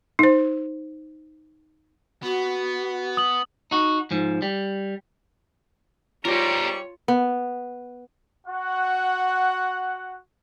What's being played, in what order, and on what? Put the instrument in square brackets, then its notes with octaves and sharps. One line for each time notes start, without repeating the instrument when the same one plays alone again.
[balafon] D#4 C5
[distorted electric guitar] B3 [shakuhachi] F#4
[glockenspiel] D#6 F#7
[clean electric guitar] D#4 F#4
G#2 F3
G3
[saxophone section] G#2 G3 [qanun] F4 [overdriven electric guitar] G4 A#4 [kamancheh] C#5 C#6
[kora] B3
[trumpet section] F#4 F#5